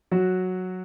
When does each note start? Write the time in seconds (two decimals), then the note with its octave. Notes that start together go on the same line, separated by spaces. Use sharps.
0.11 F#3 F#4